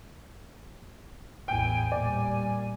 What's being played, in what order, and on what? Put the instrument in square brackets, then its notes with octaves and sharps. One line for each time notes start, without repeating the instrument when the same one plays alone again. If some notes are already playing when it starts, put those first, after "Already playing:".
[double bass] A1 E2 [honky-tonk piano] G5 [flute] G#5
[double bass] A#2 G3 [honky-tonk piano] D5